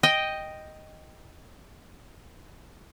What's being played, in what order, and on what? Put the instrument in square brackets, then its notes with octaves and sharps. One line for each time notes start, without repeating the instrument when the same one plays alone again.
[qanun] D#5 G5